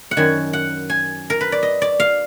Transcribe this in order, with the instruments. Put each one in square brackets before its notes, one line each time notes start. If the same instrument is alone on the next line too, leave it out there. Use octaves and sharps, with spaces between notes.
[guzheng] F#5
F#2 D#3 G#5
F#5
G#5
A#4
B4
D5
D#5
D5
F5